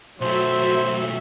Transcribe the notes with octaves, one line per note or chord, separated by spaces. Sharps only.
B1 F#3 A3 C5 E5